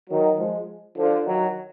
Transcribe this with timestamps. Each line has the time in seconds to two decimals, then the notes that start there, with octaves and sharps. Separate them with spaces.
0.10 D#3 F#3
0.39 F3 G#3
0.97 D3 F3
1.26 D#3 F#3